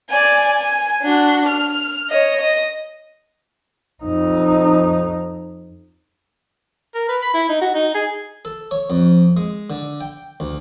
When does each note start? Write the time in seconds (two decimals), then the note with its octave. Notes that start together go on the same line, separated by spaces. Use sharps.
0.10 D5 G#5
0.59 G#5
1.02 D4 F#4
1.48 F6
2.10 C#5 D#5
2.41 D#5
4.04 F2 D#4
6.95 A#4
7.09 B4
7.22 B5
7.34 E4
7.49 D#4
7.62 F#4
7.75 D#4
7.95 G#4
8.45 A4
8.71 C#5
8.90 F2
9.37 G#3
9.70 D3
10.01 G5
10.40 D2